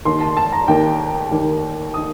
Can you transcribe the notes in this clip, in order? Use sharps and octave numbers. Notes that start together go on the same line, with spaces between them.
D#2 D#3 A#3 C6
A5
A5
A#5
D#2 D#3 A#3 G5
D#2 D#3 A#3
D#3 A#3 D#6